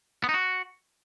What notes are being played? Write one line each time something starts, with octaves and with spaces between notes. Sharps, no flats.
B3
D#4
F#4